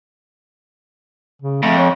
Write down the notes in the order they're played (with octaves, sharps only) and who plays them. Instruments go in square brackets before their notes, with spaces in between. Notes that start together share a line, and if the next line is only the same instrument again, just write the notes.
[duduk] C#3
[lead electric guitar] F2 [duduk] A3
[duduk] C#5